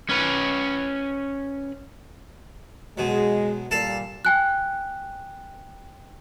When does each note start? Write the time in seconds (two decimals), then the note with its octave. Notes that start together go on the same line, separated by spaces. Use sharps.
0.09 C#4 B4
2.98 B2 F#3 G#3
3.71 A#2 G3 A4 F5 A5
4.25 G5 G#5 F#6